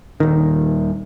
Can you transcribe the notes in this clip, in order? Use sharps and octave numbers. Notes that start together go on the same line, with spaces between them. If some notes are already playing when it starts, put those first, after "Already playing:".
D#1 D#3